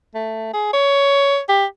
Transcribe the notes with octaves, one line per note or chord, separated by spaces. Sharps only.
A3
G#4
C#5
G4